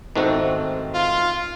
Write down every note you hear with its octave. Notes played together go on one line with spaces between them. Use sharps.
G#2 D#3 A3 C4 F#4
F4